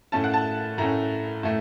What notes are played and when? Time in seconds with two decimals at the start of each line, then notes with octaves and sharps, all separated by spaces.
0.12 A2 A3 C#4 A5
0.24 F#5
0.34 A5
0.78 A2 A3 C#4 A#5
1.43 A2 A3